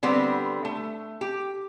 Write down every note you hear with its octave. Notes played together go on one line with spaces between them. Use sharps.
D3 G3 B3 C4
A3
G4